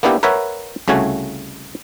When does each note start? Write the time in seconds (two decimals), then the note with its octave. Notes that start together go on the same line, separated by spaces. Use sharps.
0.03 A#3 B3 D4 E4 G4
0.23 A#4 B4 C#5 E5 F#5
0.88 C2 C#3 A3 F#4 G#5